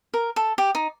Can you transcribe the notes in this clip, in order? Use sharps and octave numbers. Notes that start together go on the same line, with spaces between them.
A#4
A4
G4
D#4